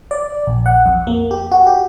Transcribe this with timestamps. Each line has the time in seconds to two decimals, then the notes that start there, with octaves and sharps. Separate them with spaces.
0.11 D5
0.47 A#1
0.66 F#5
0.86 F2
1.07 A#3
1.31 G4
1.51 F#4
1.67 G4